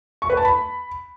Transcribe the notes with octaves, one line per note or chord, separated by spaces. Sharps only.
C#6
B4
A5
B5